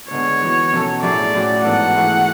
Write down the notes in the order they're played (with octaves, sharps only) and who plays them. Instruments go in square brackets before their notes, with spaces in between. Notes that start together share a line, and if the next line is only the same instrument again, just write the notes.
[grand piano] D3 G#3 B3 [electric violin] C#5
[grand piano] E3 B3 F#4
B2 F#3 C#4 F#4 A4
[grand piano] A2 F#3 A3 E4 G#4 [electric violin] D5
[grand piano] A2 F#3 C#4 F#4
[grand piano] G#2 E3 B3 F#4 A4 [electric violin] F#5
[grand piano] E3 A3 E4 G#4